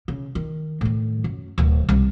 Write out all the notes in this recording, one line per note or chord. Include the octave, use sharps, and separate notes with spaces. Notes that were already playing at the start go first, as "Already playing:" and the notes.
C#3
D#3
A2 D#3
F#2
D1 D#3
C2